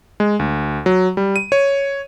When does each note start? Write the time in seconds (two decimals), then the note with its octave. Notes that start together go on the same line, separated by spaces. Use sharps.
0.20 G#3
0.39 D2
0.86 F#3
1.17 G3
1.36 D#7
1.52 C#5